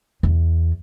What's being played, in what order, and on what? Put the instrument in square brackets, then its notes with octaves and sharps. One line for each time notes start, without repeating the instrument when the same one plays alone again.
[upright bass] E2